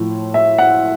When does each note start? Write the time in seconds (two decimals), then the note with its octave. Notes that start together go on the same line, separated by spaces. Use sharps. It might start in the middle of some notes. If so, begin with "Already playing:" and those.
Already playing: A2 F3
0.34 E5
0.58 F#5